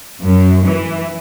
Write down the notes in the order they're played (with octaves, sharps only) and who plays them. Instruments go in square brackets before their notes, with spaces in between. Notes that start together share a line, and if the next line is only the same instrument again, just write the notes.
[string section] F#2
E3